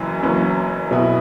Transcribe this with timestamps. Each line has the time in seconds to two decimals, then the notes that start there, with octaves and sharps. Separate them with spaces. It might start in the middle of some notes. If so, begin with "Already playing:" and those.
Already playing: F#1 F#2 E3 C#4
0.22 F#1 F#2 E3 C#4
0.91 B1 B2 B3 E4